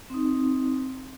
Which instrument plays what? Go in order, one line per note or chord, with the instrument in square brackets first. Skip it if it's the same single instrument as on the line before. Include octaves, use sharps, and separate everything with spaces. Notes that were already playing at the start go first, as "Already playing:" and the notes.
[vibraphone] C4 D#4